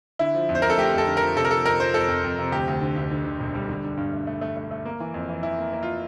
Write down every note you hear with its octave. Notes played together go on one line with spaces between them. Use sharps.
D3 E4
F3
F2
C5
F2 A#4
A4
A3 G4
F2 A4
D3
F3 A#4
C3 A4
A#4
F3 A4
F2 A#4
F3 C5
F2 A4
F2
F2
C3
D2 G4
D2
D3
D2
D3
D3
E1
G3
D3
D3
G2
A3
A3
A3
A3
A3
A#3
E3
F2
E3
E3 E4
A#3
A#3
F4